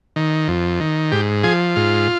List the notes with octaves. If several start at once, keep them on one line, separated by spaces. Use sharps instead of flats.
D#3
F2
D#3
G#2 G4
F3 G#4
G#2 F4